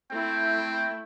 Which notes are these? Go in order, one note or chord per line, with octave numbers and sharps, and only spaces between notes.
A3 C4 E4 G5